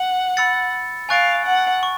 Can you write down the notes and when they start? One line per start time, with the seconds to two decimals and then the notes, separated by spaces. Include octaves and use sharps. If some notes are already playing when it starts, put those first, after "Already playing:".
Already playing: F#5
0.37 B5 E6 A6 C#7
1.09 F5 G#5 C#6 F#6 A6 D7
1.46 F#5
1.83 C#6